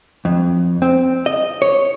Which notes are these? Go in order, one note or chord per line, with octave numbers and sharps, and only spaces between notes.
F2
C4
D#5
C#5